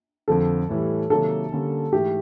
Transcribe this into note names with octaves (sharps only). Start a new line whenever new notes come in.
F2 D3 F3 A4
A2 E3 G3
C3 D#3 F#3 A#3 A4
D3 G3 A#3 C#4
G#2 E3 A3 G4